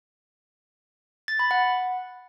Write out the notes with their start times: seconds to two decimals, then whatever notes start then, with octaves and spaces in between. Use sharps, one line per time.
1.28 A6
1.39 B5
1.51 F#5